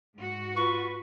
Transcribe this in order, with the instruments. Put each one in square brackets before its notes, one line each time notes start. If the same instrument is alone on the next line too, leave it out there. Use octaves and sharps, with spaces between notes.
[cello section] G#2 F#4
[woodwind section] F4 B4 [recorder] C#6